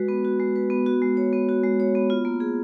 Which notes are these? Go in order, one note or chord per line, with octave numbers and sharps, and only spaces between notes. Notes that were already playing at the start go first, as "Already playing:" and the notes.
Already playing: G#3 F#4 B4
B3
F#4
G#3
B4
B3
F#4
G#3
C#5
B3
F#4
G#3
C#5
B3
F4
A#3
G#4